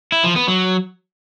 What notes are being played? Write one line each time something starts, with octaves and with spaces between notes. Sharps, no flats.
E4
F3
B3
F#3